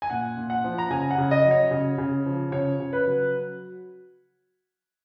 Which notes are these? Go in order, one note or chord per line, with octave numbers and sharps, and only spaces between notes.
G#5
A#2 F#5
A#2
F#5
F3
A#5
C#3 G#5
F#5
C#3
D#5
F#3
C#5
C#3
C#3
F3
C#3 C#5
C#3
B4
F#3